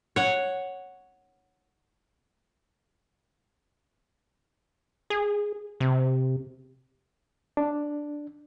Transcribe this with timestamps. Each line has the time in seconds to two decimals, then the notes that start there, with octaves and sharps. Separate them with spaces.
0.16 C#5 F#5
5.10 G#4
5.80 C3
7.57 D4